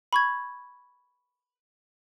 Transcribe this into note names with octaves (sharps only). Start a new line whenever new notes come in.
B5 C#6 G#6